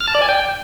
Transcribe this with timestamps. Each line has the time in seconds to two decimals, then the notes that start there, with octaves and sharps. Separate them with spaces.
0.01 F6
0.08 A5
0.15 D5
0.22 G#5
0.29 G5